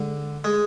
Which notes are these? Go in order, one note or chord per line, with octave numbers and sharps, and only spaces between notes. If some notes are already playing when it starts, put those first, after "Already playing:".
Already playing: D3 G#3
G#3